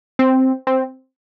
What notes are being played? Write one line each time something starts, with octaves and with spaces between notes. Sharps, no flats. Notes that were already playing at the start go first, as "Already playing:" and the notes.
C4
C4